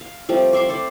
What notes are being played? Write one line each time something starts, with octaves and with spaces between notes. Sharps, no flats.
F5
F3 G3 A3 C4
D5 E5 C6 D6
A4 C5 D5